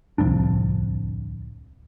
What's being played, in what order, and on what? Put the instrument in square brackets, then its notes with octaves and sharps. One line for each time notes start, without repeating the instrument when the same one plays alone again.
[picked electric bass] D1 C2 F2 D4